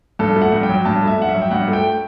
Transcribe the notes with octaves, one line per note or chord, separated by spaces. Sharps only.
G2 A4
A3
F#5
G2
G5
F#3
G2 A5
A3
E5
G2 F#5
E5
F#3
G5
G2 F#5
A3
G5